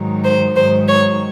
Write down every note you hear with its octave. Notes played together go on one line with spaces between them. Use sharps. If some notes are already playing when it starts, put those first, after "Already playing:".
Already playing: G#2 D#3 F#3
C5
G#2 D#3 F#3 C5
C#5